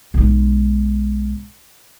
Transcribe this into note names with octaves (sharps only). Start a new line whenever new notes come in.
B1 G#3